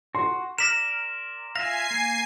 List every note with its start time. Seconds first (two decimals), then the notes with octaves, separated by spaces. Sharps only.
0.15 F#4 C6
0.58 A#4 D5 F6 A#6 B6 E7
1.55 F4 E5 F5 G#5 A#6 C7
1.91 A#3